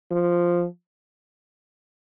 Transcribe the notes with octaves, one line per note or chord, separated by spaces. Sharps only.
F3